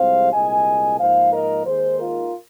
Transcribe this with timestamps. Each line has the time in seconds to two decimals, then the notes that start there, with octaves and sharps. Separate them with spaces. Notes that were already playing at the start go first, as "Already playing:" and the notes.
Already playing: C2 C3 F3 G#3 C5 F5
0.33 C2 A#2 G#3 D#5 G#5
0.99 G#2 F3 A#3 C5 F5
1.33 A#4 D#5
1.66 D#2 D#3 G#3 G#4 C5
1.99 F4 A#4